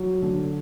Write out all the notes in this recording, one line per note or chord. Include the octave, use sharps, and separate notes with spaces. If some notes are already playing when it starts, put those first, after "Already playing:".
Already playing: F#3
D3